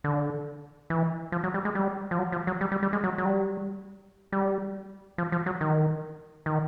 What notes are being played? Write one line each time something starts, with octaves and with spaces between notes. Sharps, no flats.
D3
E3
F3
F#3
G3
G#3
G3
F3
F#3
F3
F#3
G3
G3
G3
G#3
F#3
F#3
G3
G3
F3
F3
F#3
D#3
D#3